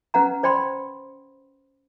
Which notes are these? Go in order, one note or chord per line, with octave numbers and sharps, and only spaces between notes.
C#4 B4 F#5 A#5
C5 D5 G5 B5 C6